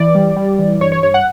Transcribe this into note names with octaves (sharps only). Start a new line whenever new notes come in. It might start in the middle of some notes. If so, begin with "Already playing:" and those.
Already playing: E3 D5
G3
G3
E3
G2 C#5
C#5
G2 C#5
F#5